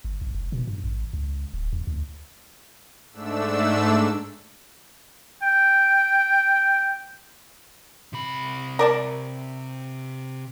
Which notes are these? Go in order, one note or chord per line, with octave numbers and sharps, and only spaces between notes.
G1
B1
F1
B2
G2
A1
C#2
D1
D#2
D2
G#2 A3 D4 E6
G5
C3 B5
A#4 D5 A5